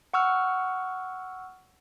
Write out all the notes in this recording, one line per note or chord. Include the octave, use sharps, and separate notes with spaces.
F#5 C#6 E6 F6